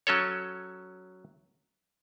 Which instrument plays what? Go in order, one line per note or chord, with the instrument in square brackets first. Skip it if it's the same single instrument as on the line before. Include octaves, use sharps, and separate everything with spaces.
[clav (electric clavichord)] F#3 C#4 A4 C#5